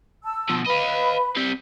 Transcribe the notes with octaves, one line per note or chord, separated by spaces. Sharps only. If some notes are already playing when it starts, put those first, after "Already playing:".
A5 E6
B2 F3
B4 D#5 F5 B5
G3 C4